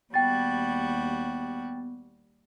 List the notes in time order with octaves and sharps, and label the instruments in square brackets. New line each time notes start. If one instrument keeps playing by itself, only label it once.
[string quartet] D#2 G3 F#4 [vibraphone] B3 [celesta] G5 A6